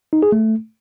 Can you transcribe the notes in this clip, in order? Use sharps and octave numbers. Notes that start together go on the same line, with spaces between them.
D#4
G#4
A3